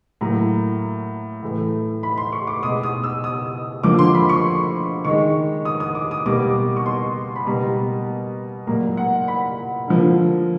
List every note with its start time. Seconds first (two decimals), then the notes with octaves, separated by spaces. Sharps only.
0.21 A2 F#3 A#3 A#5
1.42 A2 E3 A3
2.03 B5
2.18 C6
2.32 C#6
2.47 D6
2.63 B2 G#3 D#6
2.83 D#6
3.04 E6
3.24 D#6
3.83 D3 F3 A#3 D6
3.99 C6
4.15 B5
4.29 C#6
5.05 D#3 G#3 C#6
5.65 D#6
5.80 D#6
5.95 D6
6.11 D#6
6.26 B2 G3 A#3 D6
6.77 C#6
6.86 C6
7.36 B5
7.47 B2 G3 A#3 A#5
8.67 A#2 F#3 A#3 A#5
8.97 F#5
9.28 B5
9.88 D3 F3 A#3